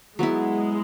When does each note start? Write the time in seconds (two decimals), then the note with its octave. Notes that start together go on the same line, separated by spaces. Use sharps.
0.18 F#3 G#3 B3 E4